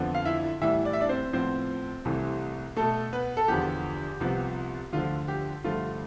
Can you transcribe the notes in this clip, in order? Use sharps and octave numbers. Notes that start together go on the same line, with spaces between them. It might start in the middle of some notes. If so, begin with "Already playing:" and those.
Already playing: F2 D3 F3 B3
F5
E4 E5
A2 E3 G3 B3 E4 E5
D5
E5
D4 D5
C4 C5
A2 F3 B3 C4 C5
C2 C3 E3 A3
B2 A3 A4
B3 B4
A4
E2 D3 F3 B3 G4
C2 C3 F3 B3
D2 D3 F3 F4
G4
G2 D3 F3 A3 F4